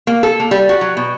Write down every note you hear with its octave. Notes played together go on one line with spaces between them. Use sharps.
A#3
A4
A#3
G3
F#4
F#3
B2